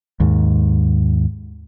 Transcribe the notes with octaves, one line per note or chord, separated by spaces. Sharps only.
D#2 G#2